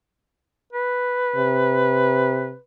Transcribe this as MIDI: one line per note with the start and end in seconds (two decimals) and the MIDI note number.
0.73 2.60 71
1.36 2.54 48